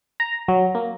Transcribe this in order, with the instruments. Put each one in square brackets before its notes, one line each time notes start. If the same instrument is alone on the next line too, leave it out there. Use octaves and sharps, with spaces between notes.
[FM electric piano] A#5
F#3
A#3